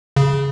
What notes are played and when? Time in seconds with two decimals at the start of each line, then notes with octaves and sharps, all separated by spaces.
0.16 C#3